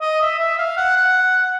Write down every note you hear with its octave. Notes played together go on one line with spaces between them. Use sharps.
D#5
E5
E5
F5
F#5
F#5